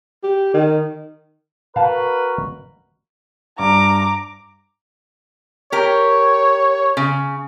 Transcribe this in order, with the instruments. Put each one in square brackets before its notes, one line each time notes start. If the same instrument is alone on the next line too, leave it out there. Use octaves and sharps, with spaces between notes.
[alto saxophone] G4
D#3
[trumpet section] F#4 A#4 B4 [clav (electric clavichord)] F5 A5
[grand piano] G2 [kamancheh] A#5 D6
[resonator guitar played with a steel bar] G4 A#4 [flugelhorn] C#5
[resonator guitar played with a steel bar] C#3